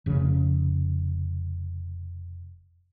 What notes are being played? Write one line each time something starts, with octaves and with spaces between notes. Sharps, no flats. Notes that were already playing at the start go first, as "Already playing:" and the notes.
F1 C#3